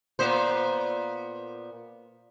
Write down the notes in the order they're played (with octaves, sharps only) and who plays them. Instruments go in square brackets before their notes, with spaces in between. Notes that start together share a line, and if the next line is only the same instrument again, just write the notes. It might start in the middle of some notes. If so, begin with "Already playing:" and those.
[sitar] A#2 B3 C5